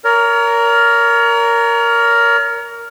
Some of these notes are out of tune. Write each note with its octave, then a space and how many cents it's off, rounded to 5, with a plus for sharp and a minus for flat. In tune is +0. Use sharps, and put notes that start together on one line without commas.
A#4 +0 C#5 +35